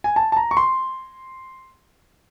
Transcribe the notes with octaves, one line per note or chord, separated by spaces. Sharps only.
G#5
A5
A5
A#5
C#6
C6